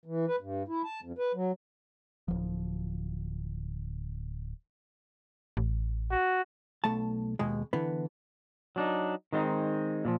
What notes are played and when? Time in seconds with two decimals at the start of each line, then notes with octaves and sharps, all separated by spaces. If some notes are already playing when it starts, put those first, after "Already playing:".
0.06 E3
0.28 B4
0.41 G2
0.68 E4
0.84 A5
1.03 F2
1.18 B4
1.35 F#3
2.28 D1 F3
5.57 A1
6.11 F#4
6.84 B1 A3 A5
7.39 D#2 B2 G#3
7.73 D3 E3 B3
8.76 F#3 D4 D#4
9.32 D#3 G#3 C4 D#4
10.05 A#2 E3 F3